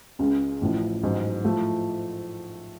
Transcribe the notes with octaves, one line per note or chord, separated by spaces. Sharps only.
C#2 C#3 G#3
A1 A2 F3
A1 G#2 F#3
A2 F3 A3 F4